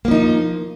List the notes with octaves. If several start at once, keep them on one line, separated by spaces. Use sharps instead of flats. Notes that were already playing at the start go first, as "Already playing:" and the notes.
F3 A#3 D#4